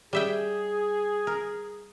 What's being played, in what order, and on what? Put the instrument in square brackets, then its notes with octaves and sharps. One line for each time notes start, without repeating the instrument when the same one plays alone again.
[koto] G3 E5 G5 [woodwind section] G#4
[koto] A#4